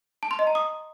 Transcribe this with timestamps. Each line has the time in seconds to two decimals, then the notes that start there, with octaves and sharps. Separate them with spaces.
0.23 A5
0.31 C6
0.39 D#5
0.47 A#5
0.55 D#6